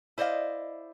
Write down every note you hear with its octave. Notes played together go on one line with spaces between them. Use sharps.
E4 C5 D5 D#5 F5